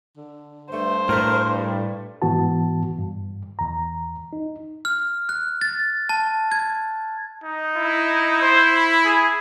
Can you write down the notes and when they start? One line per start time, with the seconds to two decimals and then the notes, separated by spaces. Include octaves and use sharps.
0.17 D3
0.72 G2 A3 C5
1.09 A2 A3 A#4
1.58 G3
2.22 G#2 E3 B3 F#4 A5
2.99 G2
3.59 E2 A#5
4.33 D#4
4.85 F6
5.29 F#6
5.61 A6
6.09 A5
6.52 G#6
7.44 D#4
7.77 E4
8.42 C5
8.76 B5
9.05 G#4